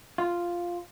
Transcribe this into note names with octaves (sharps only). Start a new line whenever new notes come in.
F4